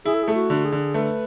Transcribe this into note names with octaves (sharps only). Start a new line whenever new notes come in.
E4 G#4
A4
A3 G#4
F#4
D3
G#4
D3
A3 B4